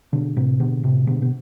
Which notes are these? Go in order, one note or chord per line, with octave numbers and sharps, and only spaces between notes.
B2 D3
A2 C3
B2 D3
A2 C3
B2 D3
B2